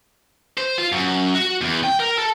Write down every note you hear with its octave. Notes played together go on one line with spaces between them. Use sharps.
C5
F4
F#2
F#4
E2
G5
A#4
A4